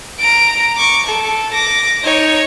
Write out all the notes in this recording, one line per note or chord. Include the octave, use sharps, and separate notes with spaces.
A#5 D7
C#6 D6
A4
D6 A#6
D#4 C#5